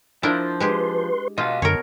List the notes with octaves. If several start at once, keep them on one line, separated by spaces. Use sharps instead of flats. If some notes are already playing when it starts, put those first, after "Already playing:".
F3 D4 E4 A#4 C5
G#3 G4 G#4 B4 C6
B2 F4 D#5 F5
F#2 B2 D3 A#4 C#5